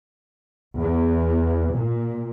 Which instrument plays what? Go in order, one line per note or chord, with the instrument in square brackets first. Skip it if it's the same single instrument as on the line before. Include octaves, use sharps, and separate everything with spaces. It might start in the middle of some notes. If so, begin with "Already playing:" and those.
[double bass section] E2
A#2